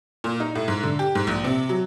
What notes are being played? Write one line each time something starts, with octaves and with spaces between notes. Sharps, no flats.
A#2
D#4
A2
G#2
D3
G4
G#2
A#1
C3
F#3